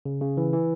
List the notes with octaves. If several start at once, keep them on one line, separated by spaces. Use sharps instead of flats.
C#3
C#3
E3
E3